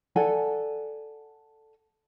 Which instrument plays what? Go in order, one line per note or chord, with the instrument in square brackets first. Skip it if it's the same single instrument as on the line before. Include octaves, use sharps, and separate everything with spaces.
[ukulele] A4 D5 F#5 G#5